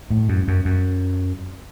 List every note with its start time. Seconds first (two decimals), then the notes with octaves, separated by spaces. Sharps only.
0.11 A2
0.29 F#2
0.48 F#2
0.65 F#2